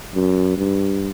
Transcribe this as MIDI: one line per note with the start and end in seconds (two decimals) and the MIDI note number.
0.15 0.54 42
0.57 1.11 43